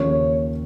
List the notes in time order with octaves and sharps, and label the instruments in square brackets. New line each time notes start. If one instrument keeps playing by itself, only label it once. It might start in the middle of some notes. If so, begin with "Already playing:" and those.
Already playing: [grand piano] D#2 C#3 F3 A#3 [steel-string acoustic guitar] C#5